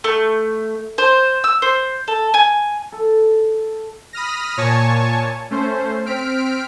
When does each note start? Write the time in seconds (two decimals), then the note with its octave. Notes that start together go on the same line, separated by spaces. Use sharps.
0.04 A3
0.98 C5
1.44 E6
1.62 C5
2.08 A4
2.34 G#5
2.92 A4
4.13 B5 D#6 F6 A#6
4.57 A#2 C#5 G#5 A5 C#6
5.50 A3 C#4 C5
6.05 C4 F6 B6 D7